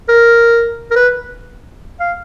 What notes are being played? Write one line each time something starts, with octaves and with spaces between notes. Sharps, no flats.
A#4
A#4
B4
F5